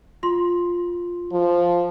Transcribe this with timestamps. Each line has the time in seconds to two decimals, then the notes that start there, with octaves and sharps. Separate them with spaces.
0.23 F4 C6
1.32 F3